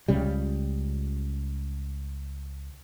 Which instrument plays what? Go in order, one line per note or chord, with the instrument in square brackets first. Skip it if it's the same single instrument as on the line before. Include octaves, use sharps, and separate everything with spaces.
[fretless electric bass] C#2 C#3 G3